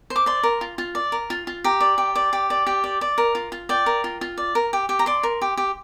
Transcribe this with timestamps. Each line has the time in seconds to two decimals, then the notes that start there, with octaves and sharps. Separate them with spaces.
0.10 C5
0.16 D6
0.26 D5 C6
0.43 A#4
0.61 F4
0.78 F4
0.95 D5
1.12 A#4
1.30 F4
1.47 F4
1.64 G4 A#5
1.81 D5
1.98 G4
2.15 D5
2.33 G4
2.50 D5
2.67 G4
2.84 D5
3.01 D5
3.18 A#4
3.35 F4
3.52 F4
3.69 D5 G5
3.86 A#4
4.04 F4
4.21 F4
4.38 D5
4.55 A#4
4.73 G4
4.89 G4
4.99 A#5
5.06 D5 C6
5.23 A#4
5.42 G4
5.57 G4